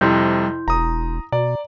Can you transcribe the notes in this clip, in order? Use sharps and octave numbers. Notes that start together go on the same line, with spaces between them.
F2 C3 G3 E4 C6 G6
E1 A#5 D#6
B2 D5 A#5